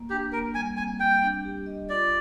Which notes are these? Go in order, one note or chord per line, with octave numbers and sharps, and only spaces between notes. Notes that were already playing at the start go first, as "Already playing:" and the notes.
Already playing: A#3
D4 G4
A#3 A#4
G3 G#5
C4 G#5
G3 G5
D4
G4
D#5
F4 D5